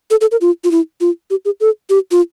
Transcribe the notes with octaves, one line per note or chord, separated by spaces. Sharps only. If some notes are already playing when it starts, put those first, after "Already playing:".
A4
A4
A#4
F4
F4
E4
F4
G4
G#4
A4
G4
F4